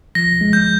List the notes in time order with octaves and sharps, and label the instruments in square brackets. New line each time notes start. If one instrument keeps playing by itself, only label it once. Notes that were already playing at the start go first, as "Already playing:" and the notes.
[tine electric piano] F3 [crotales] A#6
[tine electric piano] G#3
[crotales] G6